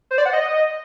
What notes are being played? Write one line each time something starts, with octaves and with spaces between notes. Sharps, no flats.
C5
D5
F#5
D#5